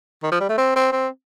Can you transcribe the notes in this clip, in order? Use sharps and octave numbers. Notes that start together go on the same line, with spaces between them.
D#3
F3
G3
A3
C4
C4
C4